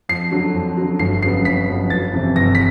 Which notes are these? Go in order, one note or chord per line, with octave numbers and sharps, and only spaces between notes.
F2 C7
D3 F#3
F2
D3 F#3
G1 C7
F2 C#3 F#3 B3 C7
G1 B6
F2 C#3 F#3 B3
G1 A6
F2 C3 E3
G1 A#6
B6